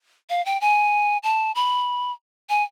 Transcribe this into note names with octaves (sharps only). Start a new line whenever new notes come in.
F5
G5
G#5
A5
B5
G#5